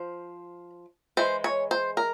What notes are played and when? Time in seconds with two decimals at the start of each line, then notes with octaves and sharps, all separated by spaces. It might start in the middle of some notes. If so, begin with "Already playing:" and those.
Already playing: F3 C5
1.17 E3 G#3 C5
1.44 C#5
1.71 C5
1.97 A#4